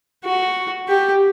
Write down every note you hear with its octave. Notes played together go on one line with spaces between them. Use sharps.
F#4
G4